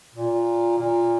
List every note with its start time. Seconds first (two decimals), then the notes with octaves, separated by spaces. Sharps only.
0.14 A#2
0.77 A#2